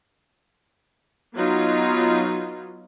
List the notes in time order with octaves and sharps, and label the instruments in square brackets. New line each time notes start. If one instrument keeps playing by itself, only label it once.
[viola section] F#3 B3 D#4 F4